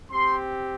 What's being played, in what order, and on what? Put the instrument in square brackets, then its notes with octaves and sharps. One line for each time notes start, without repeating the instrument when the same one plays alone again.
[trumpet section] C4 G4 C6